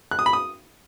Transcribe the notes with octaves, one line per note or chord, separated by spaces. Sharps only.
F#6
D#6
B5
D#6